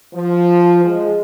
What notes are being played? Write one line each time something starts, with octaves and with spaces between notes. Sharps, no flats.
F3
G#3